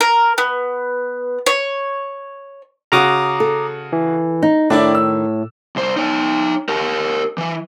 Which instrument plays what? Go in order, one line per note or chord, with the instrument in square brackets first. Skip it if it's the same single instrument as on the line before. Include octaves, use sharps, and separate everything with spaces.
[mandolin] A#4
B3
C#5
[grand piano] C#3 F#4 [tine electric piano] A#5 D6 D#6
[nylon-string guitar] A4
[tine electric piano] E3
[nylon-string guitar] D#4
[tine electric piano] A2 [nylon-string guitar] D#3 [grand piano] D4 E4 D5
[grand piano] E6
[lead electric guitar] C2 C5
D#4 C#5
G4 A#4
E3 E4